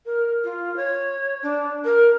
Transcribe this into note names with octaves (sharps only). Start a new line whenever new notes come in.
A#4
F4
C#5
D4
A#4